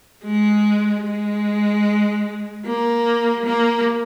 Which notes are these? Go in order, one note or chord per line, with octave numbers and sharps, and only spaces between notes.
G#3
G#3
A#3
A#3